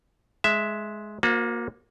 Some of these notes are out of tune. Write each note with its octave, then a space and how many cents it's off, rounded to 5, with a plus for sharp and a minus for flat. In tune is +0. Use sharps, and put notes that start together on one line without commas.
G#3 +10 E5 +0
A#3 +10 F#4 -35 C5 +0